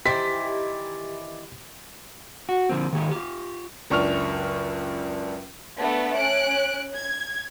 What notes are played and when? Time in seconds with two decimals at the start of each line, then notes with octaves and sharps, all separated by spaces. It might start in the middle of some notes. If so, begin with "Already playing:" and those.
0.06 D#3 E3 E4 G4 C5 D5 B6
2.49 F#4
2.69 D3 F3 A#3 C4
2.93 D#3 A3 A#3 F#4 G4 A4
3.11 F4 G4
3.90 F#1 C#2 D4 C#6 F6 F7
5.79 A3 B3 D4 B4
6.16 C#4 F#6 D7
6.95 G#6